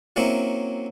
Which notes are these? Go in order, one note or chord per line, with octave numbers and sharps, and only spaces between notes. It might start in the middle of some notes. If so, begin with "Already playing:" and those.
F#3 A#3 C4 C#4 E4